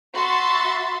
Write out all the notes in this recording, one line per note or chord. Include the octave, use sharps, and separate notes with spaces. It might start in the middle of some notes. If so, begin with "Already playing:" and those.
F#4 E5 B5 C6 A6